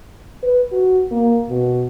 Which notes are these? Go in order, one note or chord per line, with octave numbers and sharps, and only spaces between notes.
B4
F#4
A#3
B2